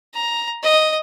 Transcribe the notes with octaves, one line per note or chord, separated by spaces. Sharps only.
A#5
D#5